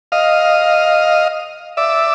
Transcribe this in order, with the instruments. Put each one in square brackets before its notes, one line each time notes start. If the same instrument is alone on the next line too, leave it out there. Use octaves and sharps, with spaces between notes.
[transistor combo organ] D#5 F5
D5 E5